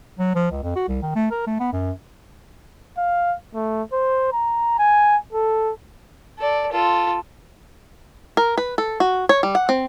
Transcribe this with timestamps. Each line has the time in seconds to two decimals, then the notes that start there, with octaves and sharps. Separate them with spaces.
0.19 F#3
0.35 F3
0.51 C#2
0.63 F2
0.75 F#4
0.88 C2
1.02 D#3
1.15 A3
1.31 A#4
1.47 A3
1.59 B3
1.72 F#2
2.98 F5
3.55 A3
3.93 C5
4.33 A#5
4.79 G#5
5.33 A4
6.38 A4 D5
6.72 F4 A4
8.37 A#4
8.58 B4
8.78 A4
9.00 F#4
9.29 C#5
9.43 G3
9.55 F#5
9.69 C4